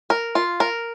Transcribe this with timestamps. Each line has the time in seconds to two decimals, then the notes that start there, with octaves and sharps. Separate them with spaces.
0.10 A#4
0.35 F4
0.60 A#4